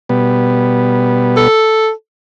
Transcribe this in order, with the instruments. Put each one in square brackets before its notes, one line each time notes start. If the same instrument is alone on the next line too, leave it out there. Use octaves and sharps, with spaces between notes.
[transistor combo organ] B2 G3 B3
[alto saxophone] A4